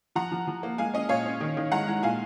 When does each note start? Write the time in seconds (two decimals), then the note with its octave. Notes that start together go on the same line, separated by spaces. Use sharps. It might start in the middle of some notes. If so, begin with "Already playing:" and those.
0.15 F3 F#5 A#5
0.32 F3
0.47 F3
0.63 A#3
0.78 G#3 F5 G#5
0.94 C#4 D#5
1.09 A#2 C#5 F5
1.26 C#4
1.40 D#3
1.57 D#3
1.72 G#3 F#5 A#5
1.88 G#3
2.03 A#2 F5 G#5